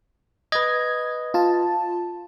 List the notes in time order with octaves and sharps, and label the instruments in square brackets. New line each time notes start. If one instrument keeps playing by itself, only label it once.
[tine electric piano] B4 D#5 [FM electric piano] G#6
[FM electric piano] F4 A5